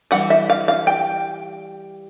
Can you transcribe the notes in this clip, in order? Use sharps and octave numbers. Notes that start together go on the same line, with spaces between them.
E3 G3 F#5
E5
F5
F5
G5